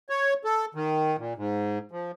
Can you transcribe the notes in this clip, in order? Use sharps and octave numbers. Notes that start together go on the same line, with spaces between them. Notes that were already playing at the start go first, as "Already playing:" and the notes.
C#5
A4
D#3
A#2
G#2
F3